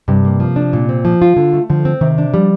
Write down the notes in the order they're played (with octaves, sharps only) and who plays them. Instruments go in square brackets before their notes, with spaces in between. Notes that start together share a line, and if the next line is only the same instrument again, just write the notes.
[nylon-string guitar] G2 [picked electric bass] C3
[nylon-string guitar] A#3
F3
D4
A#2
C4
F3
F4
D3
A3
[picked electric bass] D3 [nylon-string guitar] F3
[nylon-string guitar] C4
[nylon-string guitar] C3 [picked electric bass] D#3
[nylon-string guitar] D4
[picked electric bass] F3 [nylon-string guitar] G3